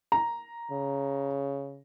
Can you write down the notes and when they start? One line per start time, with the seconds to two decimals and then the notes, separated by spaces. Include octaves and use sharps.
0.12 A#5
0.72 C#3